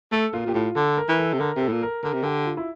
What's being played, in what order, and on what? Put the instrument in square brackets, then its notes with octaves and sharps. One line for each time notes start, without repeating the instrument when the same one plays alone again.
[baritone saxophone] A3 [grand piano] A4
[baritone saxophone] A#2 [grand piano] F4
[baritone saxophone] A#2 [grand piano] G4
[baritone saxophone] A2 [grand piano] F4
[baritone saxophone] D3 [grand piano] A4
[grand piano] A#4
[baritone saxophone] E3
[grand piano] A4
[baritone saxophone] C3
[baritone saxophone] D3 [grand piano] A#4
[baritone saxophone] C3
[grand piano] A4
[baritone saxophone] A2
A#2
[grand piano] A#4
[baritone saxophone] D3 [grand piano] A#4
[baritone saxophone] C3
[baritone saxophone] D3 [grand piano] G4
[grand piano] F4
E4